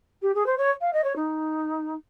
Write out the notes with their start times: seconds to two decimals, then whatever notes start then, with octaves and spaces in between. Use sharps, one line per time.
0.22 G4
0.35 G#4
0.46 C5
0.58 C#5
0.81 F5
0.93 D#5
1.04 C#5
1.16 D#4